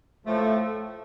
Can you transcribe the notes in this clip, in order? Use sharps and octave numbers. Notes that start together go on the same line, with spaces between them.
A2 F3 A3